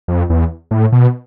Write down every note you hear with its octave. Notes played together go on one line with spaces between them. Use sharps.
F2
E2
A2
B2